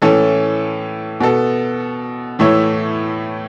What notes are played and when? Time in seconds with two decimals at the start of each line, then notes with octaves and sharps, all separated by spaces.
0.02 A2 E3 C#4 A4
1.20 B2 B3 A4
2.39 A2 E3 A3 E4 C#5